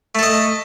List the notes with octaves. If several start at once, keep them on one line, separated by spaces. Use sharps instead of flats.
A3 A4 D#5